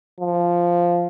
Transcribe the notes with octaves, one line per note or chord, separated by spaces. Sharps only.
F3